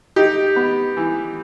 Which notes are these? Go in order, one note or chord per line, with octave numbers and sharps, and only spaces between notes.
D#4 G4
B3
E3